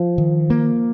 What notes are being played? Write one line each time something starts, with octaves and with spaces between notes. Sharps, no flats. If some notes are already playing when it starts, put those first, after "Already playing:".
Already playing: F3
D#3
A#3